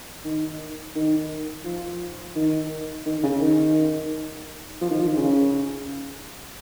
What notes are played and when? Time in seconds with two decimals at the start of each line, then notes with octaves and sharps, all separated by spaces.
0.24 D#3
0.95 D#3
1.65 F3
2.36 D#3
3.06 D#3
3.23 C#3
3.41 D#3
4.81 F3
4.90 D#3
4.99 F3
5.08 D#3
5.17 C#3